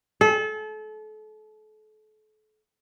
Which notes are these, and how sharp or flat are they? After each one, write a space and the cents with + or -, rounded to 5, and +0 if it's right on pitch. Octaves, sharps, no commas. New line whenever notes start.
A4 -35